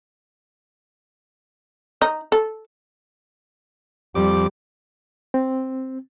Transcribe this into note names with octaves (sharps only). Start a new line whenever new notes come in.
D#4
A4
F2 G3 D6
C4